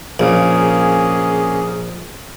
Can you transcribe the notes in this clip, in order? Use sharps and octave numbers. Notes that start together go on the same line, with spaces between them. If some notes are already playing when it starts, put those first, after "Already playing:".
A#1 A#3 C#4 G#4